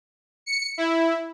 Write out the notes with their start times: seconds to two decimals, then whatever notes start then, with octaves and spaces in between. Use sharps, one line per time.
0.46 C#7
0.78 E4